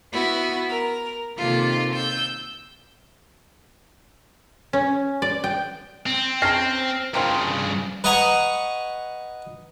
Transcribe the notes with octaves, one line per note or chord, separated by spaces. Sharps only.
B3 E4 F#4
A#4
C3 D#3 A#3 F4 A4
E6 G6
C#4
D5
G5
C4
C#4 G#4 A5 F6 A#6 C7
G2 C#3 A#3 C4 F4
B4 D#5 F#5 G#5 A#5 C#6